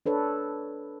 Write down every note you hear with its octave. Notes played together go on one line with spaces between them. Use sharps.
D4 A4 B4 C#5